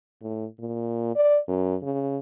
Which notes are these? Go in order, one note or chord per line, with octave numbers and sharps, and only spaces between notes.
A2
A#2
D5
F#2
C#3